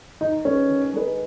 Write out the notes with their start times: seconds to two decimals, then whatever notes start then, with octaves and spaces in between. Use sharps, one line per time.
0.21 D#3 D#4
0.45 G#3 C#4 D#4 G#4 B4
0.69 D#3
0.93 G#3 D#4 G#4 B4